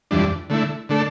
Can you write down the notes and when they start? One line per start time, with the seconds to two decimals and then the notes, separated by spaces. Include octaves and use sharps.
0.11 F2 E3 G3 D4
0.50 D3 A3 E4
0.89 D3 A3 D4 A4